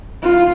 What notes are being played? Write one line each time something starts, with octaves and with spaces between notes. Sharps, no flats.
F4